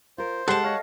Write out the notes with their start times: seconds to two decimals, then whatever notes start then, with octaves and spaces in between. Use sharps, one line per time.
0.18 F4 A#4 C5
0.48 G#3 G4 A4 F#5 A5 C6
0.64 A4 C#5 D#5 F5